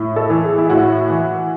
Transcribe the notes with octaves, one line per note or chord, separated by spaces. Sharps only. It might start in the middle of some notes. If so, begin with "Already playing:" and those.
Already playing: A2
A4
E3
G#4
E4
A2 F#4
E3